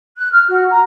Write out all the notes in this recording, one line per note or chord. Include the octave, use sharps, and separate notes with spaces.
F#6
F6
F#4
A#5